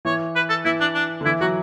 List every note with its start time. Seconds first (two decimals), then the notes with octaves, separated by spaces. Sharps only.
0.05 E3 C#5
0.36 B4
0.49 A4
0.65 E3 E4
0.81 D4
0.95 D4
1.21 D3
1.25 E3 E4
1.41 F#3 F#4